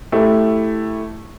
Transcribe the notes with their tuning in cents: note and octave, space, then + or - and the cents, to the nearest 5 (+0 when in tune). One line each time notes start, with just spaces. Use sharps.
A3 +0 E4 +0 G4 +0